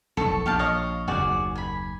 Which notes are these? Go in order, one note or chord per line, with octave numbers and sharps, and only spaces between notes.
F1 B1 A4 C#6
A#1 G4 F5 A5
C#5 D#5 F5
F#1 D#2 F#4 G#4 D5
G#5 B5